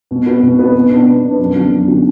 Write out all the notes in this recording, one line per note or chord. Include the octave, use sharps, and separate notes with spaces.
B2
B3 F#4 B4
B2
B3 F#4 B4
B2
B3 D4 B4
B2
B3 D4 B4
F#2
D3 B3 D4 F#4
F#2
D3 B3 D4 F#4